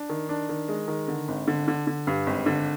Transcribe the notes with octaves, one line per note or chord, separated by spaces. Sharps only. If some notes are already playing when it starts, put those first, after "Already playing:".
Already playing: D4
D#3
D4
D#3
G#3
D#3
D3
G#1
D3
D3
D3
G2
G#1
D3